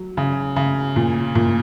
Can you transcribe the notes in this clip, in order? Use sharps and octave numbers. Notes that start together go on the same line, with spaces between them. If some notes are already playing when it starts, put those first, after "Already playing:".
Already playing: F#3
C#3
C#3
A#2
A#2